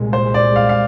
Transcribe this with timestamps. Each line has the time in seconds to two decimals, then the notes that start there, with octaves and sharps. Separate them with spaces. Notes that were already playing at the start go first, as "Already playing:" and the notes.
Already playing: C2 A#2 G#3
0.13 C5
0.34 D5
0.56 F5
0.69 F5